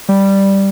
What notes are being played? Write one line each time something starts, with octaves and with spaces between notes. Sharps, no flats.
G3